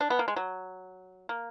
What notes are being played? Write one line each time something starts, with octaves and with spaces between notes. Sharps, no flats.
D4
B3
A#3
G#3
F#3
A#3